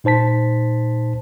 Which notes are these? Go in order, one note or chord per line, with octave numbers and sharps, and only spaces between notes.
A#2 D#4 C5 A5 B6